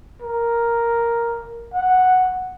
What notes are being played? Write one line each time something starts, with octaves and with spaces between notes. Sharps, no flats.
A#4
F#5